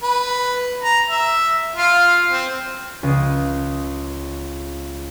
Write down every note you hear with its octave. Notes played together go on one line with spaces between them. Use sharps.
B4
A#5
E5
F4 F5
C4
C#2 D#6